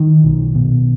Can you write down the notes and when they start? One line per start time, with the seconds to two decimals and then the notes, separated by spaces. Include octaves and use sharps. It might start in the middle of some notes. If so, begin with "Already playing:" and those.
Already playing: D#3
0.24 B1
0.55 B2